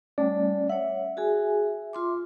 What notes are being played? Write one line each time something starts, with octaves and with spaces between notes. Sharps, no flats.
G3 A3 C#4 D5
C#5 E5 F#5
F#4 G#4 G#5
F4 C6 D6